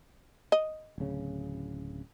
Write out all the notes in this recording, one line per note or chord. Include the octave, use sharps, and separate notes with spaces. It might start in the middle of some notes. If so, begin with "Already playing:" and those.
D#5
D1 C#3